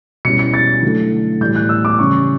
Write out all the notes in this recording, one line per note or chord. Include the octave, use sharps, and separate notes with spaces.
B2 G3 C#4 E4 C#7
C#7
A6
D3 F#3 A3 E4
A2 E3 G3 G6
F#6
E6
D6
C#3 E3 G3 C#4 E4 C#6